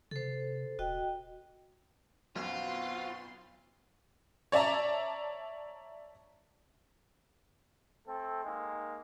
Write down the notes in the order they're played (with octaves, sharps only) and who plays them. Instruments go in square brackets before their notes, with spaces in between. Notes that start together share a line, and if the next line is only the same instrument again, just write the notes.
[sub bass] C3 [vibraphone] A4 C5
[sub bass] D#1 [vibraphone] F#4 D#5 G5
[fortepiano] B1 F#2 B2 [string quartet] B3 C6 [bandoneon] C4 F#4 [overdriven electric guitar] F4
[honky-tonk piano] C#5 D5 E5 A5 A#5
[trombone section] A3 C4 A4
D#3 G#3 A#3